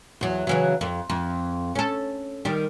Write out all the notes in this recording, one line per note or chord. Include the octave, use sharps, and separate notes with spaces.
E2 F#3
C#3 E3 F#3
F2
F2
C#4 A4
D#3 G3